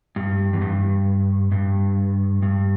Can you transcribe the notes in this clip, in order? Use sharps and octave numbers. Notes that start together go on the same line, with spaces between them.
G2
E2
G2
G2
G2